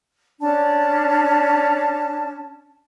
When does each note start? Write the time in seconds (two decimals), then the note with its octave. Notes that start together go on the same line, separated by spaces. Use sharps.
0.40 C#4 D4 A5